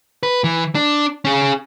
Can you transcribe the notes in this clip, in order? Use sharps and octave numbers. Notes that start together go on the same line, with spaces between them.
B4
E3
D4
C#4 G#4